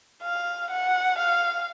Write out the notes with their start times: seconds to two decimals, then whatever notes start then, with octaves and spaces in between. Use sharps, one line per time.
0.22 F5
0.71 F#5
1.18 F5